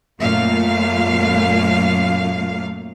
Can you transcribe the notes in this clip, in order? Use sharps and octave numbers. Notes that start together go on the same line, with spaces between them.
F#2 A#2 A3 F5